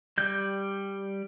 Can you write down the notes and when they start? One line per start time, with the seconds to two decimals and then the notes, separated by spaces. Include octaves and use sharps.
0.18 G3 G6